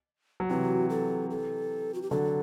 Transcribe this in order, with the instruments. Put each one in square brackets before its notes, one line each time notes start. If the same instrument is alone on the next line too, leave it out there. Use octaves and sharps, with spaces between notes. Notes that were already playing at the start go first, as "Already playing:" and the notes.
[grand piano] F#3
[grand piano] C3 E3 [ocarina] F#4
[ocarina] A4
A4
F#4
G4
[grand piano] D3 F#3 [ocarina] A4